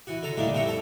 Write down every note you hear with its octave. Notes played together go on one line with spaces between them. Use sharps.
E3 F#4
D3 A4 A#5
D#3 G3 A3 A#3 D4 E4
C2 F2 C4 E4 A#5 C#6
A4 A5 A#5